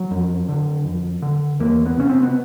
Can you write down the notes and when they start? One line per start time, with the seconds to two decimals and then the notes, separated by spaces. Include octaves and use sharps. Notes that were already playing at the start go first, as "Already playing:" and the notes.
Already playing: F#3
0.11 F2
0.49 D3
0.85 F2
1.22 D3
1.60 E2 A#3
1.86 B3
1.98 C3 C#4
2.09 C4
2.23 B3